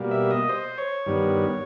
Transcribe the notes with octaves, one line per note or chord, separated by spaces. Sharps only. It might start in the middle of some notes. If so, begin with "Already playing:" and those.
Already playing: B2 G3 A#3
E5
D#5
C5
C#5
G2 D#3 G3 B3